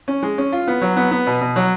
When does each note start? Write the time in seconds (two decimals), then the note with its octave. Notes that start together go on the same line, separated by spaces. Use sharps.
0.08 C#4
0.23 G#3
0.38 C#4
0.52 F4
0.67 B3
0.81 F#3
0.97 B3
1.11 B3
1.27 B2
1.41 B2
1.56 F#3